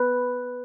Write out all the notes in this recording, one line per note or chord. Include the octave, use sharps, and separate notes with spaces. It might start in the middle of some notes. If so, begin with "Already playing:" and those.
Already playing: B4